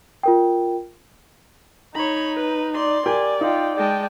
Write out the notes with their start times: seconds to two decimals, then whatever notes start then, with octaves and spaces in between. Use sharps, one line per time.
0.23 F4 A#4 G5
1.95 D#4 C#5 A#5 B5
2.36 B4
2.74 D5 C6
3.06 G4 A#4 D5 G5 G#5
3.41 D#4 F4 G5
3.77 G#3 D5 G5 A5